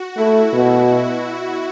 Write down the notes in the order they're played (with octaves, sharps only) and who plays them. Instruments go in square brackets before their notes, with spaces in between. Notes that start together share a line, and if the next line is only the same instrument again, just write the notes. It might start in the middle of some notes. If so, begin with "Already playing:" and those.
Already playing: [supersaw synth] F#4
[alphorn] A3 [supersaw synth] E4
[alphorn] B2